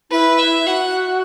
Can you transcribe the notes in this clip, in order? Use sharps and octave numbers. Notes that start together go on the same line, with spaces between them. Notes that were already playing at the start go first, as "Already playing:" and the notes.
E4 B4
E5
F#4 F#5